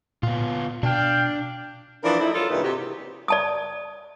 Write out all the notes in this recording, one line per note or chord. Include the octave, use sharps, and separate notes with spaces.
A#2 B3 F4
B2 D4 F5 G5
E3 F3 D4 E4 A#4
F3 A3 D#4 E4
F#3 F4 A4
G2 A#2 C#3 E3 D#4
C3 F#4 G4
D5 A5 D#6